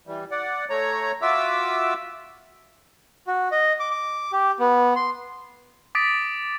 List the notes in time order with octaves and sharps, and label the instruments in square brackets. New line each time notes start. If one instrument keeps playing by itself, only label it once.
[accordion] E3 G3
D5 F#5
A3 C#5 A#5
F4 F#4 E5 D6 E6
[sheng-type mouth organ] F#4
D#5
D6
D6
G4
B3
C6
[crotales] D6 D#6 A6 B6 D7